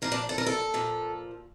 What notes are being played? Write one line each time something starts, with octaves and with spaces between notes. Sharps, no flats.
A#2 F3 A#4
D4
A4
A#4
A4
A#2 F3